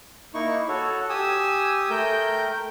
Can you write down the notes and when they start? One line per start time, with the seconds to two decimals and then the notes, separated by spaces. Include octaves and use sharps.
0.34 A#3 D#4 E4 C#6
0.68 F#4 A4 C#5
1.09 G4 G#5 D#6 E6
1.90 A3 A#4 G5 G6